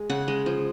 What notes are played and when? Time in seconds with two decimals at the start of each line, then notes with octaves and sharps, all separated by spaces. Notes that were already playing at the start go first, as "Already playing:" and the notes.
Already playing: G#3
0.09 C#3 F#5
0.28 G#3
0.46 F3